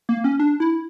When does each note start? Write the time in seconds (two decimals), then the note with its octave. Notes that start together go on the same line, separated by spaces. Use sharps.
0.09 A#3
0.24 C#4
0.39 D4
0.60 E4